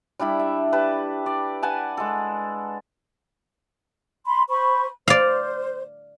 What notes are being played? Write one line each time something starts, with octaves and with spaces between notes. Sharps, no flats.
G3 D4 E4 B5
E5
G4 B4 A5
D5
B4 F#5 G#5 A5
G#3 A4
B5 C6
C5 B5 C#6
C5 D5 F5